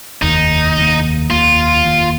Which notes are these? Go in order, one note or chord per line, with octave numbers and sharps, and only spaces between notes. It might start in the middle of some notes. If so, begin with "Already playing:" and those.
F1 D#2 D#3 A#3 D#4
F1 D#2 D#3 A#3
F1 D#2 D#3 A#3 F4
F1 D#2 D#3 A#3